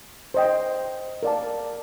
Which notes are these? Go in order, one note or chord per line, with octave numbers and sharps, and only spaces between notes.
C5 D#5 G5
A#4 D5 F5 A5